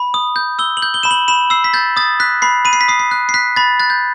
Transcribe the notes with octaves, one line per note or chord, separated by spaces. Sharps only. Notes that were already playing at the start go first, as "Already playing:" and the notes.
Already playing: B5
D#6
G6
E6 G7
F#7
G6
G7
B5 E7
F#7
B5 E7
E6 C7
B6
G6 A6
D#6 A6
F#6 B6
B5 C7
B5 D#7
C7
B6
D#6 C7
C7
F#6
C7
F#6 B6
B5 A6
F#6 A6
G6